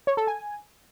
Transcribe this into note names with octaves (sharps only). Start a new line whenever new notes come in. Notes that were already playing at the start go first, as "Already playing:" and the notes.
C#5
A4
G#5